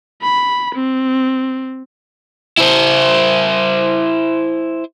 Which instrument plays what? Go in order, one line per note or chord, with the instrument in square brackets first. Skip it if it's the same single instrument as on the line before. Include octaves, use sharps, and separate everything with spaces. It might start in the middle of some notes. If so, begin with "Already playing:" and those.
[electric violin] B5
C4
[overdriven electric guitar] E4 C5